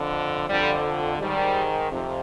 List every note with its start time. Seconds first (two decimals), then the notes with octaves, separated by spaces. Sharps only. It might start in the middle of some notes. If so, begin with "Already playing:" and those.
Already playing: F2 D3
0.49 F2 D3 G3
1.19 G#2 D#3 G3
1.91 F2 C3